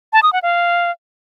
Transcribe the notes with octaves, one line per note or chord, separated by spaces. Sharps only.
A5
D#6
F#5
F5